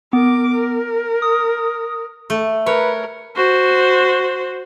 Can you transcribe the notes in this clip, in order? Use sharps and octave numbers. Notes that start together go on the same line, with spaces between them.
B3 A#4 D6
A#4
D#6
A3
A#4 B4 C#5
F#4 C5